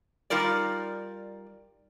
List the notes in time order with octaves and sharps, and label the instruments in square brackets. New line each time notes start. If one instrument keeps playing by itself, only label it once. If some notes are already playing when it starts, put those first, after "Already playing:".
[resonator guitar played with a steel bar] G3 D#4 F4 A#4 D5